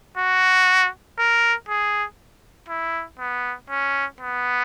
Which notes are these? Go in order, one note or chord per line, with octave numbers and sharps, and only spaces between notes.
F#4
A#4
G#4
E4
B3
C#4
B3